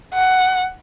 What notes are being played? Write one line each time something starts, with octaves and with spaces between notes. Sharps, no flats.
F#5